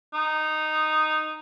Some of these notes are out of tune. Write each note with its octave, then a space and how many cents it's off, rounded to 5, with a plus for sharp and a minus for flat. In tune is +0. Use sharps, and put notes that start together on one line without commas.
D#4 -10